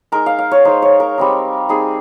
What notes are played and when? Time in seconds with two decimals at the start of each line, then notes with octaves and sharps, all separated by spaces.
0.12 G#3 D#4 A#4
0.26 F5
0.39 F5
0.51 C#5
0.65 G#3 D#4 C5
0.82 C#5
1.00 A#4
1.18 G3 C4 D#4
1.69 G3 C4 D#4 G#4